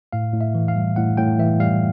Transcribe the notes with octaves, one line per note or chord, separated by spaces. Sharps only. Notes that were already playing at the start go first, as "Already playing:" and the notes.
A2 F5
A2
E5
E3
F5
G3
A2 F#5
A2 G5
E3 E5
G3 F5